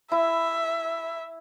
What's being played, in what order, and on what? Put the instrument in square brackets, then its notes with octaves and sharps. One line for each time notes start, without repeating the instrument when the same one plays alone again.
[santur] E4 [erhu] E5